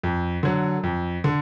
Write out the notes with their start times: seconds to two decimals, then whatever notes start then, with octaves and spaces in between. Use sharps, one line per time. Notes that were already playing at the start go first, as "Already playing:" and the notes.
0.03 F2
0.43 D3 F#3
0.83 F2
1.24 D3